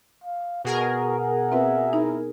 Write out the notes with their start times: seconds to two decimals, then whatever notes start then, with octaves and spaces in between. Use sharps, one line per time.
0.24 F5
0.64 B2 F#4 G#4 A#4
1.19 F#5
1.52 C4 F4 B4 E5
1.93 D#4 E4